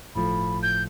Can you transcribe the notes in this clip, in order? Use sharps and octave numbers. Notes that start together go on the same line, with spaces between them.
G1 A2 F3 A3 B5
G6